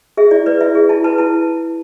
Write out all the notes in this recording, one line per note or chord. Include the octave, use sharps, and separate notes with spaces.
G#4 E5
E4 D5
B4 D5
E4 E5
G#4
E4 A5
B4 A5
E4 A5